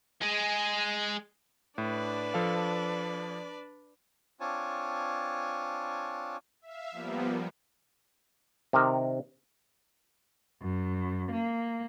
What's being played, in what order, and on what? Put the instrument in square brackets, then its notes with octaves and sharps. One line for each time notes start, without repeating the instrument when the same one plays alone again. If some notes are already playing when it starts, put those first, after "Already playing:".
[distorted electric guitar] G#3 G#4
[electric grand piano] A2 [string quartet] D4 B4 D5
[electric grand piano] F3 A4 F5
[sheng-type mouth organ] C4 D4 F4 C#5 G#5 A5
[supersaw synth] E5 F5
F3 G3 A#3 B3
[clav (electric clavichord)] C3 D#3 A#4
[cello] F#2
A#3